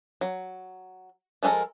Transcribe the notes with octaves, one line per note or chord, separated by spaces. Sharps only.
F#3
F3 G#3 F#4 A4 A#4